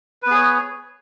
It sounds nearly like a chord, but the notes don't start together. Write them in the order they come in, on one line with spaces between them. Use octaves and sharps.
B4 B3 G#4 C#5